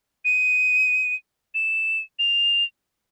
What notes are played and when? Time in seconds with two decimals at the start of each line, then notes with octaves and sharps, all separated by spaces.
0.25 D#7
1.54 E7
2.19 F7